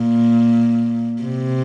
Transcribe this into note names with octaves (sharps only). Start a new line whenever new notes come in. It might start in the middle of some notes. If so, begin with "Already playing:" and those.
Already playing: A#2
C3